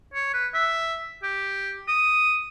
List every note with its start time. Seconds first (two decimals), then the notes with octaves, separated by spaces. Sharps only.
0.14 C#5
0.33 B4
0.54 E5
1.23 G4
1.88 D#6